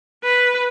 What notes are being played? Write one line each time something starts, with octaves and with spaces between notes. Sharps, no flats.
B4